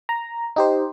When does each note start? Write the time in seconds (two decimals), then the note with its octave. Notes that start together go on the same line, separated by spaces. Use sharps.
0.09 A#5
0.56 D#4 G4 C5